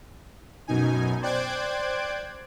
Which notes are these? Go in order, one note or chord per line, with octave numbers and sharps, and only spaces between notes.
F#2 B2 D#4 G#5
C5 D5 G5 D6 F#6 G#6